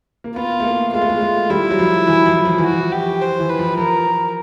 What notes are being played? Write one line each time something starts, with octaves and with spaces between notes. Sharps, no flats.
A#3
B3 F4
A3
A#3
G#3 F4
A3
G#3
G#3
G3 E4
F#3
F3
E3
F3
F3
E3
F#4
F3
G4
C5
E3
B4
F3
F3 A#4